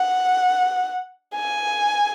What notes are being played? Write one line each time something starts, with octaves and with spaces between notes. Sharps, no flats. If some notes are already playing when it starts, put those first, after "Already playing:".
Already playing: F#5
G#5